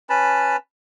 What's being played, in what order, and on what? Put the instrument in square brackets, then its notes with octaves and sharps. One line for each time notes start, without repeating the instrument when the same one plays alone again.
[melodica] C#4 B4 A5 B5